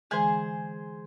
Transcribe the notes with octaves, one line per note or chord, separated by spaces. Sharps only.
D3 E3 G#3 G#4 C5